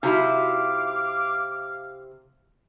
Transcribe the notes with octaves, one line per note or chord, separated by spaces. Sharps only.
C3 D#4 E4 F#4 F5 B5 D6